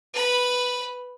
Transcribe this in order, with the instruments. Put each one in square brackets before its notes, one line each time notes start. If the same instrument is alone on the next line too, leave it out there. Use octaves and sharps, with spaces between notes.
[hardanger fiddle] B4 B5